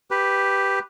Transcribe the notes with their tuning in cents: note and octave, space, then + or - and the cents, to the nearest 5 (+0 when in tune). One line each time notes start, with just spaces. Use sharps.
G4 +0 B4 +0